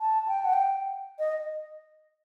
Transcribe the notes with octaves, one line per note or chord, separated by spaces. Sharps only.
A5
G5
F#5
G5
D#5